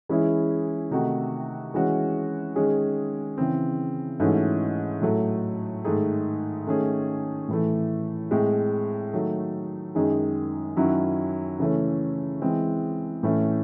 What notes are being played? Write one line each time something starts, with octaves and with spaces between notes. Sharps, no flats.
E3 G#3 C#4 E4 G#4
C3 D#3 A3 D#4 F#4
E3 G#3 C#4 F#4
D#3 G#3 C#4 G#4
C#3 E3 C4
G#2 E3 A3 C#4 F#4
A2 F#3 A3
G#2 D#3 A3 D#4 G#4
D#3 A3 C#4 G#4
A2 E3 A3
A2 G#3 C4
D#3 F#3 A3
F#2 D#3 G#3 D#4 G#4
F#2 D#3 F#3 C#4 E4
C#3 E3 A3 C#4
E3 G#3 C4
A2 E3 A3 C#4